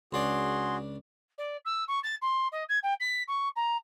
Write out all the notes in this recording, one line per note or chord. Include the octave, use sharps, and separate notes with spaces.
C#2 D4 F#4 G#4 D5 C6
D5
E6
C#6
A6
C6
D#5
G#6
G5
B6
C#6
A#5